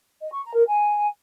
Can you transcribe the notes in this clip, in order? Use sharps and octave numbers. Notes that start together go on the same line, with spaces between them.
D#5
C#6
A#5
A#4
G#5